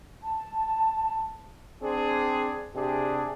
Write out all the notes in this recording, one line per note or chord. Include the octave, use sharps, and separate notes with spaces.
A5
C4 D4 G#4
C3 D4 G4 G#4